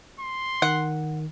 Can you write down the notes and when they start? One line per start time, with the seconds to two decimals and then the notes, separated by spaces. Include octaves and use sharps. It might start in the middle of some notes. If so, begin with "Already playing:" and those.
0.20 C6
0.62 D#3 F#5